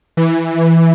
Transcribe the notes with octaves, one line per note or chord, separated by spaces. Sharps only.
E3